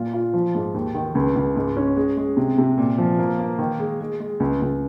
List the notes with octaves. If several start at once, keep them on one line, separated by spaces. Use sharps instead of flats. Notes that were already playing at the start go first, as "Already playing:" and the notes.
Already playing: A#2 F4
F4
F3
G#2
D#2
D#3
C#2
C#2
G#2
C#4
G#3
G#3
C3
C3
A#2
F3
A#3
A#3
D#3
G#3
G#3
G#3
C#2
C#2